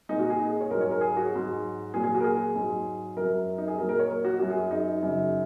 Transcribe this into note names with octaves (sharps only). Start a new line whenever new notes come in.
A#2 G#3 D#4
F#4
G#4
D#4
G#4
C#5
G#2 F#3 A#4
C#5
A#4
G#4
F#4
G#2 F#3
A#2 F#3 G#4
G#4
F#4
A#4
G#4
G#2 F#3
F#2 F#3 A#4
D#4
G#4
A#2 F#3 A#4
A#4
C#5
A#4
F#4
F#2 F#3 F#4
G#4
D#4
F#2 C#3 F#3